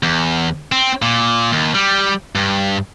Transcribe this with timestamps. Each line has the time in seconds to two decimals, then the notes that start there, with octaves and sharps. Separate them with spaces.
0.03 E2
0.72 C4
1.02 A#2
1.52 D#2
1.75 G3
2.35 G2